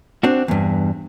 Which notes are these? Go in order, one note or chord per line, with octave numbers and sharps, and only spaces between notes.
C4 D4 F#4
E2 G2